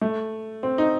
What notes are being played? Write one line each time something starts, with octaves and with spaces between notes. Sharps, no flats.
A3
C4
D#4